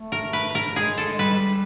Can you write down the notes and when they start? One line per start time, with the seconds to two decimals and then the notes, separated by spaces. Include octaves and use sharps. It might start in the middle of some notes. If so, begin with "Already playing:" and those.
Already playing: A3
0.12 A#4
0.33 B4
0.55 A#4
0.76 G#3 G#4
0.98 A4
1.13 G#3
1.19 G3 B4